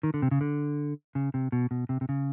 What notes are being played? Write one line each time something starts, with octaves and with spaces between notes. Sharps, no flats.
D#3
D3
C3
C#3
D3
C#3
C3
B2
B2
C3
C3
C#3